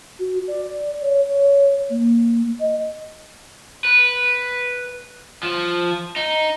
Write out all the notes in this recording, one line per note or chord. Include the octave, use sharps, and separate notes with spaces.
F#4
D5
C#5
C#5
A#3
D#5
B4
F3
D#4